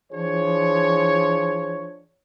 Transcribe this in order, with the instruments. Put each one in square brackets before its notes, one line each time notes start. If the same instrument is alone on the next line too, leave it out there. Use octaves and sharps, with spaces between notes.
[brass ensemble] E3 F3 D4 G#4 C#5